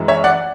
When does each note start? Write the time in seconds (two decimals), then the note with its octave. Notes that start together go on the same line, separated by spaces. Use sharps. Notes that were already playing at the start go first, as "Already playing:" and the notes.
Already playing: F#2 E3 G#3
0.08 C#5 E5
0.24 D5 F#5